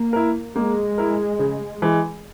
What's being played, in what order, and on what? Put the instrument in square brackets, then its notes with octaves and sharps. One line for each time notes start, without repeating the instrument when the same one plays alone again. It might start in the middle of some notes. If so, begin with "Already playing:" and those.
Already playing: [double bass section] A#3
[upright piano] E4 A#4
[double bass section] G#3 [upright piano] A#3
[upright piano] E4 A#4
C#3
E3 G#3